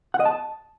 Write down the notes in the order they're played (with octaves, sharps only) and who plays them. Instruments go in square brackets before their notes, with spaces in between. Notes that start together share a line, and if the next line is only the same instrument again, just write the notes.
[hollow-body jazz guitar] F#5
D#5
A5